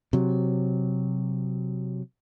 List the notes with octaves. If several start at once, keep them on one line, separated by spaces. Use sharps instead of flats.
C3 F#3